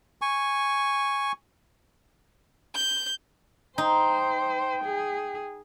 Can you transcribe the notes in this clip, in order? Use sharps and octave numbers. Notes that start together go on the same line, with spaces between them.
G#5 C#6
G6
D#4 C5 G5
G#4